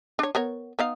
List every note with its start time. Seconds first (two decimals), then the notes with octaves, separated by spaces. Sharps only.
0.19 D4 C#5
0.35 B3 A#4 C#5
0.79 B3 D#4 F5